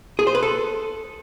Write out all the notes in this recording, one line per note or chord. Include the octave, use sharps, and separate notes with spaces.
G#4
C5
B4
A4